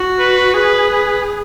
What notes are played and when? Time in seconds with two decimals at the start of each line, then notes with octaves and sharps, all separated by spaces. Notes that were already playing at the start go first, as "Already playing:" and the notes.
Already playing: F#4
0.19 B4
0.54 G#4 B4
0.90 B4